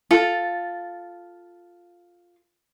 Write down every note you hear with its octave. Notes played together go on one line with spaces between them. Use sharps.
F4 A4